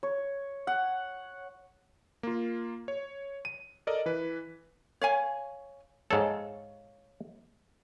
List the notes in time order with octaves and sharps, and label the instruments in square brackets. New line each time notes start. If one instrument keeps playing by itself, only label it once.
[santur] C#5
F#5
[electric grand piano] A#3 F4
C#5
D#7
A4 A#4 D5 D#5
E3 B4
[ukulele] C#5 F5 G#5
[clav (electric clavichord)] G#2 A4 [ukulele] C#5 F5